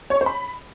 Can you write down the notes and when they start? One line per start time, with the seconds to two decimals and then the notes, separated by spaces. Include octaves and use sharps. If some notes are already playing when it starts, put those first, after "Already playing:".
0.10 C#5
0.16 C#6
0.21 C5
0.26 B5